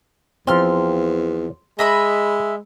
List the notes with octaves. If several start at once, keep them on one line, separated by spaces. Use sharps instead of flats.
E2 F3 C4 C6 F6
G#3 D#5 E5 A#5 B5